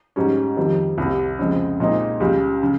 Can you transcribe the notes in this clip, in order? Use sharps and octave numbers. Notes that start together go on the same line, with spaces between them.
G#2 G3 C#4
F2 D#3 G3
C2 C3 G3
F2 C#3 G#3 C4
A#2 G#3 C4 D#4
C#2 C#3 G3
C#3